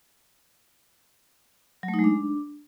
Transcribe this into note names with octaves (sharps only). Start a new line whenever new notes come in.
F#3
A3
D#4
G#3
D4